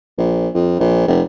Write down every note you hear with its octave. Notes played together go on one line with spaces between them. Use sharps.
A#1
F2
A#1
F1